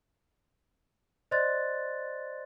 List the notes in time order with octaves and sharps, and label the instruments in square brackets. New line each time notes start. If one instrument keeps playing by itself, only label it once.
[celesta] C5 D5 D#5 C6 F#6 A6